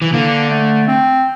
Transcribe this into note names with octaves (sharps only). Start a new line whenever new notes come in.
E3
D3 A#3
A3
C4